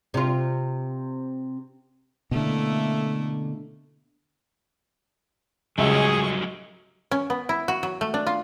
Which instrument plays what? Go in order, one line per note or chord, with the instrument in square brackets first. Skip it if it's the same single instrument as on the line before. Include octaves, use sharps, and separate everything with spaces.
[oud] C3 F4
[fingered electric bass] B2 D3 [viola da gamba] A3 A#3 E4
[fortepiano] C#2 E5 [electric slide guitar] F#3 G3 C#4 [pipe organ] G#4 [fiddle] D#5 C#6
[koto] C#4
B3
E4
F#4
F#3
A3
D4
F4